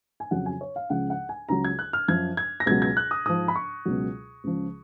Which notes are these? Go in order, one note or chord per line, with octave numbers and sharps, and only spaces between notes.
G#5
F2 C#3 F#3 F#5
G#5
C#5
F5
C#2 C#3 F3 F#5
F#5
G#5
C#2 C#3 F#3 A#5
G#6
F#6
F6
F#2 F3 G#6
G#6
A#6
C#2 B2 F#3 G#6
G#6
F#6
D#6
G#2 F3 D#6
B5
C#6
C#2 B2 F#3
C#2 C#3 F3